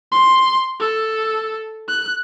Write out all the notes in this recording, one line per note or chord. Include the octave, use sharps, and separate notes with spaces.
C6
A4
F#6